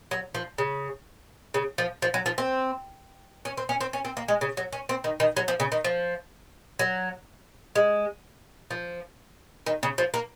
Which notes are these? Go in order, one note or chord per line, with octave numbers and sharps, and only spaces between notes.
F#3
F3
C#3
C#3
F3
F3
F#3
F3
C4
C#4
C4
C#4
C4
C#4
C4
A#3
G#3
C#3
F#3
C#4
C4
D#3
D#3
F#3
F3
C#3
D#3
F3
F#3
G#3
F3
D#3
C#3
F3
A#3